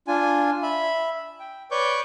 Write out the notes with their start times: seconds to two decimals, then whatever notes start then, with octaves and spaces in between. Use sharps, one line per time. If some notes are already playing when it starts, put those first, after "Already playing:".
0.08 D4 F4 G#5
0.63 E5 B5
1.40 G5
1.71 B4 C#5 D5 C#6 D6 G6